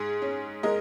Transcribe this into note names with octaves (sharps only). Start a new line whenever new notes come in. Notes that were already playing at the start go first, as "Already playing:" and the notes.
Already playing: G#2 G#4
C#4
G#3 A#4 D#5